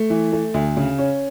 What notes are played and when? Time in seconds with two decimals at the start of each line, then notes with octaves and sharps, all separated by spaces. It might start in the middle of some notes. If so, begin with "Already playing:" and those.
Already playing: A3
0.10 E3
0.32 A3
0.54 D2
0.77 C#3
0.98 C#4